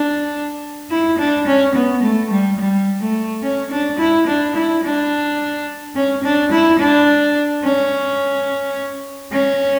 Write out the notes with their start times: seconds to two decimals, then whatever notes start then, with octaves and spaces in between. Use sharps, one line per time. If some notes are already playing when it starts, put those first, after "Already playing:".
Already playing: D4
0.90 E4
1.18 D4
1.47 C#4
1.75 B3
2.02 A3
2.30 G3
2.58 G3
3.01 A3
3.43 C#4
3.71 D4
3.98 E4
4.26 D4
4.55 E4
4.83 D4
5.96 C#4
6.24 D4
6.51 E4
6.79 D4
7.64 C#4
9.32 C#4